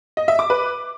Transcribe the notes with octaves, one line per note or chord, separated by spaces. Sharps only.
D#5
E5
D6
B4